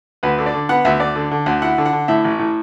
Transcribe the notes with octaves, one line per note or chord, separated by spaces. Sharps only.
D2 B4
D3
D5
D3
B3 F#5
D2 E5
D2 D5
D3
D3
D2
E4 F#5
D3
F#5
D3
A2 E5
A1
A2